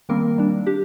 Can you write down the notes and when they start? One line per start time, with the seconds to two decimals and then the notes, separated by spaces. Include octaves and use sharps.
0.09 D#3 G3 A#3 C4 A#4
0.38 G3 D4
0.66 D4 G4